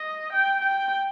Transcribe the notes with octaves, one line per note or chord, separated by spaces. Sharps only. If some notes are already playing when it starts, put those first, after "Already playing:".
Already playing: D#5
G5
G5